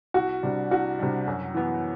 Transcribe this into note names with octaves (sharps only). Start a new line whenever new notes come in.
C2 F#4
C3 G3 D4
C2 F#4
C3 G3 D4
F#2
E3 B3